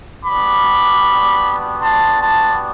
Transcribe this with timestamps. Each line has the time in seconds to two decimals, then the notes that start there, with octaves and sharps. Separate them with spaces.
0.25 G3 B3 D4 F#4 B5 D6
1.81 A5 C6
2.20 A5 C6